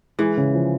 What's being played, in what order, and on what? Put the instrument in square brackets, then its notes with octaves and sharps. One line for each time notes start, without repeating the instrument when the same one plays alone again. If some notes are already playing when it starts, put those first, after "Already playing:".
[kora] E3 [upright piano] G#3
[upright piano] C#3
F3